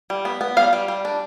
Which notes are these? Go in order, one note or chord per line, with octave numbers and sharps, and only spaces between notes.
G3
B3
B3
G3 F5
G3
G3
D4